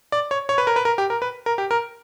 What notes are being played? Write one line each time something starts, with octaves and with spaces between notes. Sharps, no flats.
D5
C#5
C#5
B4
A#4
B4
A#4
G4
A#4
B4
A#4
G4
A#4